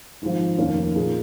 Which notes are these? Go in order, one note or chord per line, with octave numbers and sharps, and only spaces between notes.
G#1 G#2 F3
F1 D#2 D#3 A#3 C#4
A#2 A#3 D#4 G#4